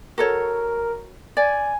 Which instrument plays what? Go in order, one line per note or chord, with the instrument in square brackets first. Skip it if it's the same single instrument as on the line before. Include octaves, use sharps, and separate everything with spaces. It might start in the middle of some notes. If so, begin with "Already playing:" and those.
[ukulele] F#4 A4 C#5 [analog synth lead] A#4
[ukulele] D5 [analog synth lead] G#5